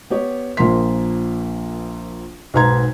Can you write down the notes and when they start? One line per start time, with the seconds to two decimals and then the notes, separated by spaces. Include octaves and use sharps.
0.10 B3 G4 C#5
0.57 A#1 F3 A#3 C6 B6
2.54 B1 G#2 B4 A#5 C6 G#6